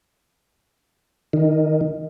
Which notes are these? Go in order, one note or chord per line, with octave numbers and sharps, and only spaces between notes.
D#3